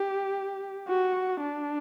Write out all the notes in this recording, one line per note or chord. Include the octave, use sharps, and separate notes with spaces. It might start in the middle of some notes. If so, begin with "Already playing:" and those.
Already playing: G4
F#4
D4